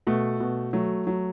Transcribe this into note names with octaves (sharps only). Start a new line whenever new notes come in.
B2 A3
B2
F#3 A3
F#3